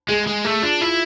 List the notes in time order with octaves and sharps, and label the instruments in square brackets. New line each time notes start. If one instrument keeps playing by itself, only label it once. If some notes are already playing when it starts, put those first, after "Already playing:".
[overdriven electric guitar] G#3 [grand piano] G#4
[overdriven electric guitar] G#3 [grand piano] G#4
[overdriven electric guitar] A3 [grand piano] G#4
[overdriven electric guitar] D4 [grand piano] F4
[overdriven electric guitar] E4 [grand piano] F4